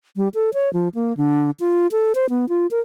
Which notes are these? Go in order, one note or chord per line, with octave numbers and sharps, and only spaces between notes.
G3
A4
C#5
F3
A#3
D3
F4
A4
C5
B3
F4
A#4